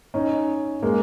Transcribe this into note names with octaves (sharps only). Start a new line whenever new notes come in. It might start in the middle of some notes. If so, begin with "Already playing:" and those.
C#4 D#4
G#3 A#3